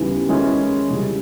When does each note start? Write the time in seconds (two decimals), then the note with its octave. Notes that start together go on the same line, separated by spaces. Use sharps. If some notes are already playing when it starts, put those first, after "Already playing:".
Already playing: D#2 C#3 E3 G3 B3
0.29 D#3 G#3 C#4 E4 G#4
0.90 C#2 C#3 E3 G3